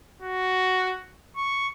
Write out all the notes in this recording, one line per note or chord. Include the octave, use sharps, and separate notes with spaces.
F#4
C#6